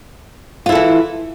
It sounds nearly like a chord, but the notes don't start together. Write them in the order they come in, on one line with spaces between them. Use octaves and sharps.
F4 E4 A4 E3